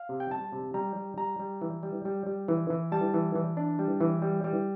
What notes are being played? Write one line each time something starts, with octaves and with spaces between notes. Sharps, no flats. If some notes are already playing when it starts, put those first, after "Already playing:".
Already playing: F5
C3
G5
G3 A5
C3
G3 A#5
G3
G3 A#5
G3
E3
G3
G3
G3
E3
E3
G3 A5
E3
E3
D4
G3
E3
G3
G3